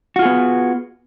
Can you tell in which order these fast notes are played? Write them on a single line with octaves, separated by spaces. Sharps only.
F#4 F4 G#4 B3